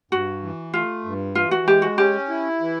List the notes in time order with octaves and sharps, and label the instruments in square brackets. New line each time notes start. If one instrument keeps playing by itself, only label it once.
[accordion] G2 [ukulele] F#4
[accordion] E3
[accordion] A3 [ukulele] F4
[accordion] G2
[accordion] E3 [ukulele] F4
[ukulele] F#4
[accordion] G#3 [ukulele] G4
[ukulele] F#4
[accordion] C#4 [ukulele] G4
[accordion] E4
E3